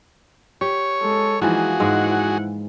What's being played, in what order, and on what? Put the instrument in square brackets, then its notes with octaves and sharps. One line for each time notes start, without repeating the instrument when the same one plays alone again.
[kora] G4 [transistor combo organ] C#5
[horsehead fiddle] G#3 A4
[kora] E3 F3 A#3 [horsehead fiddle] G#3 D#4 [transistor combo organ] F#4 G#4
[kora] G#2 G#3 [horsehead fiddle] E4 F#5